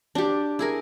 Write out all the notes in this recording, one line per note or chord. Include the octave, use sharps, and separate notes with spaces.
D4 G4
E4 G#4 A#4